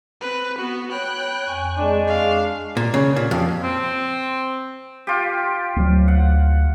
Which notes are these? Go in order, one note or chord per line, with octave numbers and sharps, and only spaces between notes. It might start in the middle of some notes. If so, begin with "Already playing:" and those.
C4 B4
B3 F#4
C#5 G5 B5 F#6
F2 G#5 C#6
G#3 D4
F5
A#2
C#3
A#2
F2
C4
F4 G4
D2 F#3
F#5